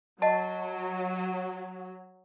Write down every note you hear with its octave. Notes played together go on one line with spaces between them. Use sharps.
F#3 D#5 F#5 A5